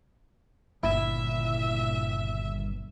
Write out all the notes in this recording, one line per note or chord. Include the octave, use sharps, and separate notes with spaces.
G1 A#2 C#3 E4 E5